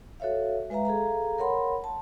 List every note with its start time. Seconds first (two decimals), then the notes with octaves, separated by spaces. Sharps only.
0.20 F#4 A4 C#5 E5 F5
0.70 G#3 B4 E5 F5 A#5
0.85 G#4 A4 F5 A#5
1.38 A#4 C#5 F#5 B5 C6
1.84 A5